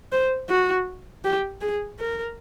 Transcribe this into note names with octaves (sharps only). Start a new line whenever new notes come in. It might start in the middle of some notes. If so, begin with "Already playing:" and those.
C5
F#4
G4
G#4
A#4